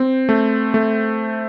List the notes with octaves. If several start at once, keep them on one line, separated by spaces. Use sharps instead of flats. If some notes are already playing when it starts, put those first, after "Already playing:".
Already playing: C4
A3
A3